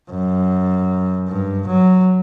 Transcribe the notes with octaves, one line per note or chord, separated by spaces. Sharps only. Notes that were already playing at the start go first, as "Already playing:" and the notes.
F#2
G2
F#3